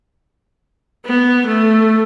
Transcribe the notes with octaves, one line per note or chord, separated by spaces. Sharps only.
B3
A3